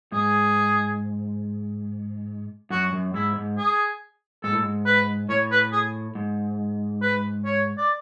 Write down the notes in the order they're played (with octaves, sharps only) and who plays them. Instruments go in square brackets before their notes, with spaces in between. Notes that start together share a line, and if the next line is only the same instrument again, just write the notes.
[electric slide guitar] G#2 [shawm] G#4
[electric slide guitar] F#2 [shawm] F#4
[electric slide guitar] F#2
[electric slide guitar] G#2 [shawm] E4
[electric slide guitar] G#2
[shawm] G#4
[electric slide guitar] G#2 [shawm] A4
[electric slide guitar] A2
G#2
[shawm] B4
[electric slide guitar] A2 [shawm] C#5
[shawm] B4
G#4
[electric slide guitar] G#2
[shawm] B4
C#5
D5